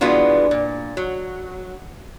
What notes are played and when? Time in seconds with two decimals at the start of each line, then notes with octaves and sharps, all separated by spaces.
0.01 E3 G#3 B3 D4 F4 F#4
0.51 A#2
0.97 F#3